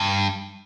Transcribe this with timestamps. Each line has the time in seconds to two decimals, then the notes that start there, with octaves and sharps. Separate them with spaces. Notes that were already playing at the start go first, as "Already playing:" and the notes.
Already playing: G2